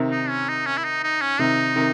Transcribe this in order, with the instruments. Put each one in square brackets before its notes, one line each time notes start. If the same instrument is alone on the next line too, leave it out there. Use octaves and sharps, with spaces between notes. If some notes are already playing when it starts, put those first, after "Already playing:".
Already playing: [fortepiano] C3 D#3
[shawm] D#4
C#4
D#4
C#4
E4
D#4
D#4
C#4
[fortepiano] C3 D#3 [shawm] D#4
[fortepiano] C3 D#3